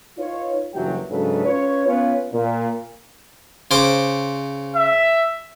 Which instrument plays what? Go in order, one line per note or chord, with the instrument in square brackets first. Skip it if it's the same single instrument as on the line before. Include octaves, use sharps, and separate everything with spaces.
[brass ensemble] D#4 F4 B4 C#5
F#1 G2 E3 F#3 G4 G5
G#2 C#3 F#3 D4 A4 B4
C#4 F4 B4 C#5
B3 C#4 F4 B4 C#5
A#2
[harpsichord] C#3 C5 D6
[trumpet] E5